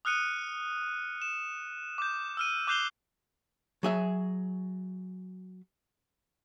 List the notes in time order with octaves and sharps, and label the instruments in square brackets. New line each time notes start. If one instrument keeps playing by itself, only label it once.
[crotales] D#6 F6 F#6 C#7 D#7
E7
D6 G6
E6 F6 D#7
D6 F#6 G6 C7 F7 G7
[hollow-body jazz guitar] F#3 G#4 E5